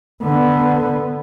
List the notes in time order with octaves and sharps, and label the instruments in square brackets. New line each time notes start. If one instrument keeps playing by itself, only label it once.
[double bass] D3 B3